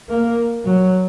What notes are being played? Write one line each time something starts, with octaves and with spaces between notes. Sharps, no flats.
A#3
F#3